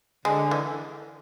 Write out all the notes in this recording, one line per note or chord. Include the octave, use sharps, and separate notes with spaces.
D3 G#3
E3